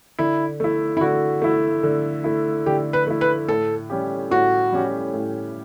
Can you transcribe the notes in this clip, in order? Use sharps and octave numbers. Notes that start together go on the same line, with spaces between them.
D3 E4
A3 E4
E4
D3 F#4
A3 E4
D3
A3 E4
D3 G4
B4
A3 E4
B4
A2 A4
G3 C#4 G4
A2 F#4
G3 C#4 G4
A2